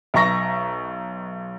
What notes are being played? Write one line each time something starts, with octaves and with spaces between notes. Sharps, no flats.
B1 E5 A#5 C#6 A#6